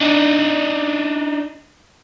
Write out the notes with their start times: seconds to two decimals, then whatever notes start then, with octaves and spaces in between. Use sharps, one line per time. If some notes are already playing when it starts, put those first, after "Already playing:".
0.01 D4 D#4